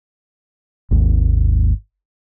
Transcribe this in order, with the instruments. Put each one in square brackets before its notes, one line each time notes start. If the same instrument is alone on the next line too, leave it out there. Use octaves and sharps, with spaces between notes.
[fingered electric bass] G#1 D#2